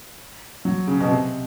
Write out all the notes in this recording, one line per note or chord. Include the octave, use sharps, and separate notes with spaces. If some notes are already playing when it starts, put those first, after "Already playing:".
F#3
C#3
B2
C3